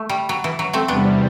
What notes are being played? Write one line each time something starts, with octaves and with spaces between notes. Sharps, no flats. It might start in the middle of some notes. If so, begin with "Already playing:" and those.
Already playing: A3
G3
F#3
E3
F#3
A3 C4
E2 C3 G3 B3 D4